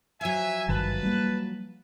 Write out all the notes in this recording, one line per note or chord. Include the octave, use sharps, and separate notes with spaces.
F3 F#3 E5 G#5
G#1 G2 D#3 B4 A5
G3 A3 A#3